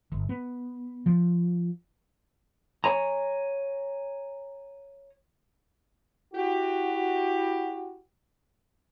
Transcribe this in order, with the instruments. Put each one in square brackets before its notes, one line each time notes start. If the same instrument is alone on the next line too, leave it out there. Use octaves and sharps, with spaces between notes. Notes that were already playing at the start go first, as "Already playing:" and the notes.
[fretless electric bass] G1
B3
F3
[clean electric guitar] C#5 G#5 A#5
[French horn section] E4 F#4 G4